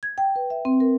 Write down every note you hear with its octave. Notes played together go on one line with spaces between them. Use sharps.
G#6
G5
B4
E5
C4
A#4